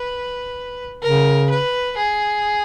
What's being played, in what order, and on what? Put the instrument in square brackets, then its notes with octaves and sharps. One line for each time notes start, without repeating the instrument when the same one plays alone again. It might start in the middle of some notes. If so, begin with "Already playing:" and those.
Already playing: [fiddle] B4
[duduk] C#3 [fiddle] A#4
[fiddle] B4
G#4